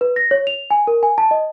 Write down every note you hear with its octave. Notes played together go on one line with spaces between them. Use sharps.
B4
A#6
C#5
F7
G#5
A#4
G#5
A5
D#5